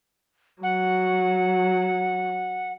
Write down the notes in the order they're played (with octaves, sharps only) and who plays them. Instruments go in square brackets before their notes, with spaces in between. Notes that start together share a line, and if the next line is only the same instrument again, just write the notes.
[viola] F#3 [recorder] F#5